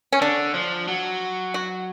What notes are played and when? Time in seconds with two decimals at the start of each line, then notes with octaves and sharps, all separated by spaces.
0.12 C#4
0.21 D3 D4
0.54 F3
0.88 F#3
1.54 F#4